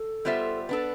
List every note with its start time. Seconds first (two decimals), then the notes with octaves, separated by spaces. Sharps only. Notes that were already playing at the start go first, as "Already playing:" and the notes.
Already playing: A4
0.25 G3 B3 F4 C5 E5
0.69 B3 D4 A4 B4